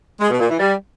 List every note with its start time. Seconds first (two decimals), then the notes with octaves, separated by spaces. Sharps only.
0.20 G#3
0.30 B2
0.40 A#2
0.50 E3
0.59 G3